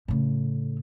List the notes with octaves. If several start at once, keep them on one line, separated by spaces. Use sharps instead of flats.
A2 C#3